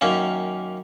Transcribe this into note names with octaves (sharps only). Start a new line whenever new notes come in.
F#2 D#3 A#3 C#4